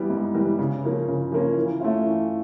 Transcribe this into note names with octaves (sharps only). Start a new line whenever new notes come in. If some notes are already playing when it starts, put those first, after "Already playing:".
Already playing: E3 G3 B3
G#2
E3 G3 B3
C#3
F3 A#3 C#4
C#3
F3 A#3 C#4
E3
A3 C#4 F4
E3